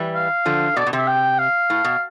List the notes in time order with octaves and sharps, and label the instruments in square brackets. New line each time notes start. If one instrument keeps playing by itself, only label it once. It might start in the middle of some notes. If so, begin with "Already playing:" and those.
Already playing: [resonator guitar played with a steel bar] E3 G3
[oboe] F5
[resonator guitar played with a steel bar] D3 F3
[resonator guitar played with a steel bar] B2 [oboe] D5
[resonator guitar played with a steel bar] B2
[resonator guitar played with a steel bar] C3 [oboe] E5
[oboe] G5
F5
[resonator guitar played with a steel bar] A2
B2